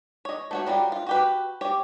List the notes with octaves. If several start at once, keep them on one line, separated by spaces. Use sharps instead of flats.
C#5 D#5
A3 F#4 C#5
F#3 G3 C4 F4
F4
F#4 G4 B4
G4 C#5